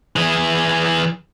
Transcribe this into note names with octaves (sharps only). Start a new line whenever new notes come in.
E3 G#4